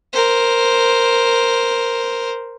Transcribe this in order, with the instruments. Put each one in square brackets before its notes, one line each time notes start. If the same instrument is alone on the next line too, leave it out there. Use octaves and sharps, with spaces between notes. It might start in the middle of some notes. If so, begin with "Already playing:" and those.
[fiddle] A#4 C5